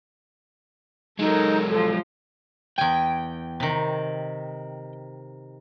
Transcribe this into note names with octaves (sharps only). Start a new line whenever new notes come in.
F#3 G#3 D#4 A4 A#4
F3 F4 A4
E2 G5 G#5
C3 D#3